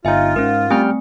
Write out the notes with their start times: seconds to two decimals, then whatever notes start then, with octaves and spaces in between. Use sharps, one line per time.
0.05 G1 D#4 F4 E5 G#5
0.36 G#2 C#4 A#4
0.70 G3 A3 C4 G5 G#5 F6